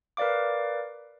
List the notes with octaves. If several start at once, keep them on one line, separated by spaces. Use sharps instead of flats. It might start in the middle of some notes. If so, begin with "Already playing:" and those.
A#4 B4 D5 F5 D6